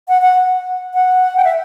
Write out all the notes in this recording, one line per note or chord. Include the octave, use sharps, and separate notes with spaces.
F#5
F#5
F#5
G5
E5